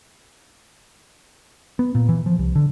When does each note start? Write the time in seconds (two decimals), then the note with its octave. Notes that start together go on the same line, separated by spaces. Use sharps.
1.79 B3
1.95 A#2
2.09 E3
2.26 F3
2.39 C2
2.56 D3